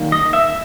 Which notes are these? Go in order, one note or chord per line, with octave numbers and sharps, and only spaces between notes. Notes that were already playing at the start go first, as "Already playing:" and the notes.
Already playing: D#3 G3 A#3 C#4
D#5
E5